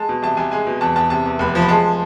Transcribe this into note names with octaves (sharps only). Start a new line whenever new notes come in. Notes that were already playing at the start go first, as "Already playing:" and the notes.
Already playing: G#3 A5
B2
C2 A5
C2 G#5
G#3 G#5
B2
E2 A5
E2 A5
C3 A5
E2
F1 B5
F3
B5
G#3 A5